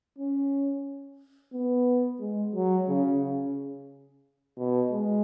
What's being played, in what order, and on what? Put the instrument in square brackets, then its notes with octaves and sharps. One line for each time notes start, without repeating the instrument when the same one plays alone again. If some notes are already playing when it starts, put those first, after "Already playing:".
[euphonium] C#4
B3
G#3
F#3
C#3
C#3
B2
G#3